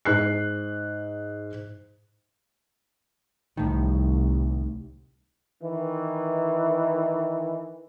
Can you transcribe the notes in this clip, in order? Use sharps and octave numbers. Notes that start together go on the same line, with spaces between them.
G#2 F#6 C7
C2 A2 D#3
D#3 E3